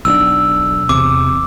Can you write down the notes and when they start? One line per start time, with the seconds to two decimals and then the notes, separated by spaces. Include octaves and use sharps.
0.05 B1 D#3 D4 E6
0.89 E2 C3 D6